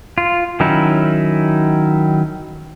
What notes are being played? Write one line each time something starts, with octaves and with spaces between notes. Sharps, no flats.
F4
D#3 F#3 C#4 D#4 E4